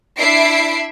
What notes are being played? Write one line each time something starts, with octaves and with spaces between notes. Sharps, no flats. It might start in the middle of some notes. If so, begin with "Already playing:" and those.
D4 E4 E5 C7 D7